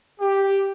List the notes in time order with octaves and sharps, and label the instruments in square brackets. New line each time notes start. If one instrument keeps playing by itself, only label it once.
[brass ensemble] G4